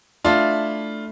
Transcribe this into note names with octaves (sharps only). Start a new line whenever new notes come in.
A3 D4 E4 F4